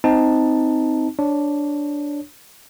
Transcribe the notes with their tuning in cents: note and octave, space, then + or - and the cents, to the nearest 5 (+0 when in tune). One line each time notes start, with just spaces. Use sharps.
C4 -10 D#4 +10 A5 +0
D4 -5 C#5 +0